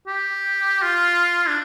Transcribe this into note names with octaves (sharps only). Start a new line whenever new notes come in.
G4
F4
D4